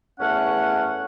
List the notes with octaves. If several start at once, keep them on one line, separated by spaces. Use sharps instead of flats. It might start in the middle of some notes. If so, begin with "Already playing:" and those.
E2 A3 C#4 F#5